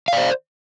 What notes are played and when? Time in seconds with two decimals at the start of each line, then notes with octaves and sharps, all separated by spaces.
0.08 F5
0.12 D5
0.17 C5